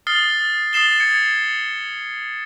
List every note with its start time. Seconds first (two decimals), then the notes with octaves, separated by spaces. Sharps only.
0.07 D#6 F6 A6 C7 G7
0.73 D#6 A6 C7 E7 G7
1.00 G#6 C#7